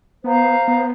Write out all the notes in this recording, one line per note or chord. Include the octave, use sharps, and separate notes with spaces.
B3 C5 F5 A#5
B3